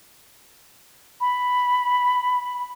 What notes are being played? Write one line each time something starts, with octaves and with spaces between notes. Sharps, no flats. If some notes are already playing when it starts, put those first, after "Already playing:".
B5